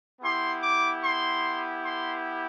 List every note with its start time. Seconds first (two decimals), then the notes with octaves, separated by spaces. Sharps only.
0.22 B3 E4 G4 C6
0.62 D6
1.03 C6
1.84 C6